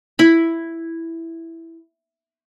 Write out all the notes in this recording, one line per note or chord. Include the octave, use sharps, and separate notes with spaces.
E4 B5